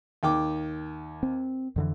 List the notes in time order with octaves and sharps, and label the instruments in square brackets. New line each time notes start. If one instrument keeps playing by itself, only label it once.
[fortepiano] D#2 G5 D6
[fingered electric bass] C4
F2 D3 E3